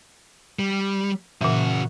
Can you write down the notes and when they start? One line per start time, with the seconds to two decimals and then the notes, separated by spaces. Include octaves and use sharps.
0.59 G3
1.41 A#2 C#3 E3 F#4